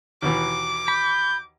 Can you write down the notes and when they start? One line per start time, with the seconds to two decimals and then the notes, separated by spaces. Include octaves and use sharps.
0.22 D#2 B2 E3 D6
0.88 B5 G6